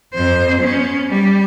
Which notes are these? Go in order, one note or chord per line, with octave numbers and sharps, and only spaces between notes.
F2 C5
B3 C#4
G3